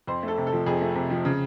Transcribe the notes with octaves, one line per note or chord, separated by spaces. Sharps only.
F2 C5
A3 A4
C3
A4
F3
F2 G#4
A3
C3
F3
C#3